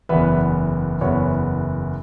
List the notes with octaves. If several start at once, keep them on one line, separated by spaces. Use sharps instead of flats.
F#1 E2 E3 B3 B4 E5
F#1 E2 E3 B3 C#5